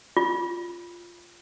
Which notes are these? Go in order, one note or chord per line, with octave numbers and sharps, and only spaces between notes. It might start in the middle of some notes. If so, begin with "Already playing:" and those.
F4